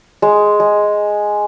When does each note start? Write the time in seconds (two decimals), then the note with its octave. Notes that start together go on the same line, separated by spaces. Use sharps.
0.22 G#3
0.60 G#3